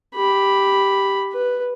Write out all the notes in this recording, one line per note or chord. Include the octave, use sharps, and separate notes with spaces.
G4 B5
B4